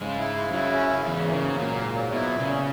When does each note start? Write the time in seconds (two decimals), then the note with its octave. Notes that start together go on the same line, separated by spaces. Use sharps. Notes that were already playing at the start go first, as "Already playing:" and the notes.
0.01 G#2 C#3 G#3
0.19 E4
0.36 C#3
0.53 F#2 F#3 E4
0.71 C#4
0.90 C#3
1.07 E2 G#2 E3
1.24 A#3
1.33 C#3
1.42 F#3
1.59 A#2 A#3
1.77 G#2
1.96 F#3
2.13 B2 E4
2.31 A#2
2.39 C#3
2.49 C#4